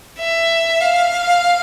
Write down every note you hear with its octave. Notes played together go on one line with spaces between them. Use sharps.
E5
F5